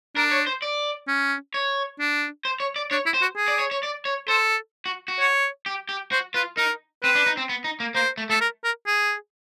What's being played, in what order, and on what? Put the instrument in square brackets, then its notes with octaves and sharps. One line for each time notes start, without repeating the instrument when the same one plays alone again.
[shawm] D4 [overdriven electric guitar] A#4
[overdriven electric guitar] C#5
C5
D5
[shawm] C#4
[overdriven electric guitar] C#5
[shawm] D4
[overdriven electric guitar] C5
C#5
D5
[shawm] D4 [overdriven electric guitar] C#5
[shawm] E4
[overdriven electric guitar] C5
[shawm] F#4
G#4
[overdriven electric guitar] D5
C#5
C#5
D5
C#5
[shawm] A4 [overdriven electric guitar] C5
[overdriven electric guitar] F#4
F#4
[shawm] C#5
[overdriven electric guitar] G4
G4
[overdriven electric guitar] F#4 [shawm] C5
[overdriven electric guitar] F4 [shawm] B4
[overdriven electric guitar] D#4 [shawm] A#4
[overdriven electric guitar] C4 [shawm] B4
[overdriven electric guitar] D4
D#4
C4
B3
D#4
A#3
[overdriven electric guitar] A#3 [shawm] C5
[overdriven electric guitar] A3
[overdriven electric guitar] A3 [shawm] A4
[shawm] A#4
A#4
G#4